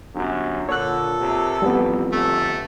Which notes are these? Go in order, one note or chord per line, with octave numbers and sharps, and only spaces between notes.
G1 F#2
A#2 D3 A4 C#5 F#6
C3
A1 F2 G3 B3
G1 A3